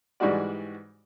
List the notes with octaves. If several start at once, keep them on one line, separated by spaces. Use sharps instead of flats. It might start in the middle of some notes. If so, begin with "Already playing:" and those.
G#2 E3 G3 G#3 F#4 D5